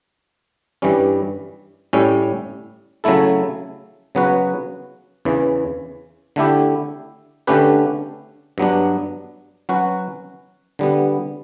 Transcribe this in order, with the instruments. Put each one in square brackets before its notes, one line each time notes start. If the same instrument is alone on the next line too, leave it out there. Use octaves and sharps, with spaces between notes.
[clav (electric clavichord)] G2 E3 G3 C#4
A2 G3 C#4
C#3 F#3 A3 E4 A4
C#3 F#3 B3 F#4 B4
E2 C#3 E3
D3 A3 E4 G4
D3 A3 C#4 G4 B4
G2 F#3 B3 D4
F#3 C#4 F#4 B4
D3 G3 B3